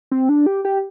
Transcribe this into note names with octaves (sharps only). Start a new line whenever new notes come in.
C4
D4
G4
G4